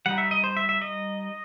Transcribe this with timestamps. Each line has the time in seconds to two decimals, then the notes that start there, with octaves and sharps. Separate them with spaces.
0.06 G3 D#4 F#5
0.18 E5
0.31 D#5
0.44 C5
0.57 E5
0.69 E5
0.82 D#5